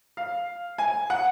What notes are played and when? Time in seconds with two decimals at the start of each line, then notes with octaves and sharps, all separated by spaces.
0.17 F5
0.78 G#5
1.10 F#5